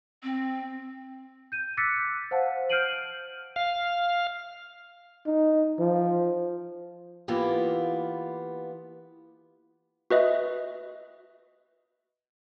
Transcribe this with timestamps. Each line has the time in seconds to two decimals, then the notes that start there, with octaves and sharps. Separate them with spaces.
0.23 C4
1.52 G6 D#7
1.77 D6 E6 F#6 A6 B6 C#7
2.31 C5 F5 F#5 A5
2.70 F6 G6 C7 D7 D#7 F#7
3.56 F5
5.26 D#4
5.79 F3
7.28 E3 A#3 B3 F4 G4
10.10 F#4 B4 D#5 E5